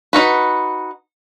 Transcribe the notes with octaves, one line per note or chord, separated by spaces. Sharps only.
D#4 F#4 B4